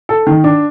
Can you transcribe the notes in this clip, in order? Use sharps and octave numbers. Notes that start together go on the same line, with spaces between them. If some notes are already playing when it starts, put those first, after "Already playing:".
A4
D#3
D4